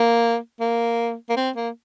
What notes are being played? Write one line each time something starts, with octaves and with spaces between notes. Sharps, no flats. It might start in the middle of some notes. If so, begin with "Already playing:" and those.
Already playing: A#3
A#3
A#3
C4
A#3